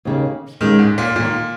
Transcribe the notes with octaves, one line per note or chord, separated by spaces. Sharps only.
D#2 C#3 A#3
A#2 D#3 G#3 C#4 F4
G#2
A#2
A#2 D#3 A#3 F4